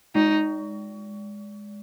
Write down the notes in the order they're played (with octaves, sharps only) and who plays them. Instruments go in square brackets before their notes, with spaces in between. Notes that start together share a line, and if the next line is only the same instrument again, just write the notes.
[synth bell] G#3 [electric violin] D#4